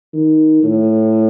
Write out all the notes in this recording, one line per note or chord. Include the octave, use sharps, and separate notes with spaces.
D#3
A2